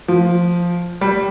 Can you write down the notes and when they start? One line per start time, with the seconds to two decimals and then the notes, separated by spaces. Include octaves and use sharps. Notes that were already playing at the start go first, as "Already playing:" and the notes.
0.08 F3
1.01 G3